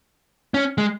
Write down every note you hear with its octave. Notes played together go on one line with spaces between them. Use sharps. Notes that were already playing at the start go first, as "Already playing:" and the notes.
C#4
G#3